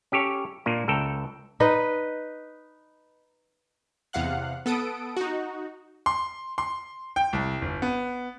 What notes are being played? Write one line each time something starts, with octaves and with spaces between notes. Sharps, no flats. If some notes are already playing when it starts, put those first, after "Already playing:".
C#4 G4 A4 C#5
A#2 A#3 D4
C#2 A4 G5 A#5
D#4 B4 D#5
E2 C3 F5 F#5 F#6
B3 A4 D#6 D7
D#4 F#4
C6
C6
G5
C2
G1
B3